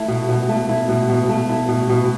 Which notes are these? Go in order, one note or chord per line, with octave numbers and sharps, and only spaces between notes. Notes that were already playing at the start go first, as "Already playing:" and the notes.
Already playing: A3 E4
B2
B2
A3
E4
B2
B2
A3
E4
B2
B2